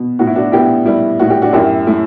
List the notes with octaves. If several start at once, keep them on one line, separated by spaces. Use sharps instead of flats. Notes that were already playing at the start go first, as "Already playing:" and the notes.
Already playing: B2
A2 F#4
E4
D4 F#4
B3 E4 G4
G3 E4
A2 F#4
G4
D4 F#4
F#2 E4 G4
A3 E4